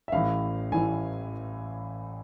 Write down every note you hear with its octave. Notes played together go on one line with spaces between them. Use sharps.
E5
A1 A2 E3 F5
A1 A2 E3 G#5